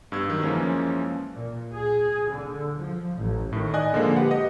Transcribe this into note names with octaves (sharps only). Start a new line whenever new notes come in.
G2 B3 E6 G#6
D#3 F#3
F#2 E3 F3 G#3 A#3 C#4
A#2
G#4
D3
F3
A1
A2 D#3
D5 D#5 G#5 F#6
A#2 D3 F3 G#3 A#3
G4 B4 F#5
G4 D#5